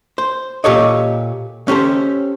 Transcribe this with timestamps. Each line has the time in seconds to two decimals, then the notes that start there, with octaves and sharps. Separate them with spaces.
0.18 C5
0.64 A#2 G4 A4 C#5 D#5
1.68 C#4 G4 A4 C5